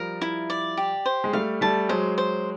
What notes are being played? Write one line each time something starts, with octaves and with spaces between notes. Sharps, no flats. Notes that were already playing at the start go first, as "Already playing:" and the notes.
Already playing: F3 G3 A#4
E4
D5
G4
C5
G#3
G3 A3 F5
G3 A3 A5
F#3 G#3 C5
C5